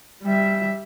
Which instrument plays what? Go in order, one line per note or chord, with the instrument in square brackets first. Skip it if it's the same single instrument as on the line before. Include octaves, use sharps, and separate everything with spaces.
[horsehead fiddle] G3 E5